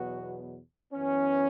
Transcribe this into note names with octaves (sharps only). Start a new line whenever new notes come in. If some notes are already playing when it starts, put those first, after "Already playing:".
Already playing: E2 B2 F#3 B3 F#4
F#2 E3 B3 C#4